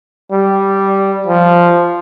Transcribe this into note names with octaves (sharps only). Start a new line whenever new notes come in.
G3
F3